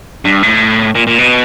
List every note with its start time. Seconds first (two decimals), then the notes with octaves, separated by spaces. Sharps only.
0.25 G2
0.43 A2
0.95 A#2
1.07 A#2
1.19 B2